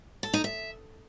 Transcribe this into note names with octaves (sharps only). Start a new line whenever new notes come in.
A4
D#4
E5